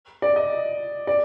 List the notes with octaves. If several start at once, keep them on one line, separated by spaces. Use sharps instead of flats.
D5
D#5
D5